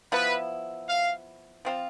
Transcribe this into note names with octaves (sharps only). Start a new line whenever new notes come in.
F3 B3 E4 B4
F5
F3 C4 F4